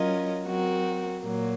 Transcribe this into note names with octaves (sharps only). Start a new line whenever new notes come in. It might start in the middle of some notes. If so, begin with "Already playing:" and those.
Already playing: F#3 C#4 F4 A#4 D#5
F#3 C4 F#4 A#4
A#2 F#3 A#3